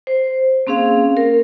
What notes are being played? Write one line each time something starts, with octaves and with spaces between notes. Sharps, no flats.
C5
A#3 C4 C#4 G#4 F5
A#4